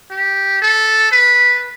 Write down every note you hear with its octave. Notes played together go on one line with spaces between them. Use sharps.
G4
A4
B4